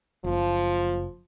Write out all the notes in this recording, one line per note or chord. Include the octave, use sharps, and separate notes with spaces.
F#1 F3